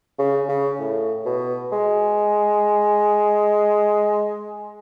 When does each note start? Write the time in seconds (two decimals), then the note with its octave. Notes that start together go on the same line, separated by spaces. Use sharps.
0.19 C#3
0.49 C#3
0.80 A2
1.25 B2
1.72 G#3